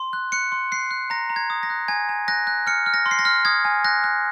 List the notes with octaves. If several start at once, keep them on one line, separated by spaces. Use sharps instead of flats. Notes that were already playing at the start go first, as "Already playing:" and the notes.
Already playing: C6
F#6
F#6 C#7
C6
F#6 C7
F#6
A#5 A#6
A#5
G#6
D#6
A#6
F#6
G#5 G#6
G#5
F#6 A#6
F#6
F6 C#7
F6
A#6
C6
C7
A#6
F6
D#6 G#6
G#5
F#6 A#6
F#6